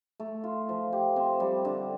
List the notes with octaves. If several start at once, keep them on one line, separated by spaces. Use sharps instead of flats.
A3
F4
F3
G4
C4
G3
D3